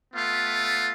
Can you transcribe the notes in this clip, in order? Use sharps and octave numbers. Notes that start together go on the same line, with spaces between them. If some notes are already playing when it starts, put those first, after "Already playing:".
A3 B3 F4